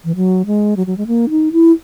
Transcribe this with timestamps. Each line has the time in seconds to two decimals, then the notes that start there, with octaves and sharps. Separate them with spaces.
0.04 E3
0.16 F#3
0.46 G#3
0.77 F#3
0.87 F#3
0.98 G#3
1.07 A#3
1.30 D#4
1.52 E4